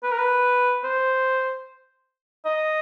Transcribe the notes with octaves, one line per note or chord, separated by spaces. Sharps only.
B4
A#4
B4
C5
D#5